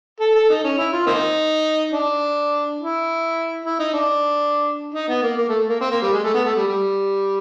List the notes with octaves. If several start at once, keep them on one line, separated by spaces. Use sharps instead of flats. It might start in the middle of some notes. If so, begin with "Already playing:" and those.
A4
A4
D#4
C#4
E4
F4
A#3 C4 D#4
D4
E4
E4
D#4
D4
D#4
B3
A#3
A#3
A3
A#3
C4
A#3
G3
G#3
A3
B3
A3
G3
G3